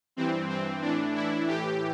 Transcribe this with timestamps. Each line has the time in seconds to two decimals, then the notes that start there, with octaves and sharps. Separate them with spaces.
0.17 G2 E3 C4
0.50 C4
0.82 A2 E3 D4
1.15 E4
1.48 A2 E3 G4